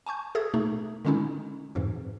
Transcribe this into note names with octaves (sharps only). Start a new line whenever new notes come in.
G#5 A5 C#6 G6
G#4 A4 E5 D#6 G#6
B2 A3 D#4
D3 D#3 G#3 C#4 D#4 E4
F2 G#2 B2 E3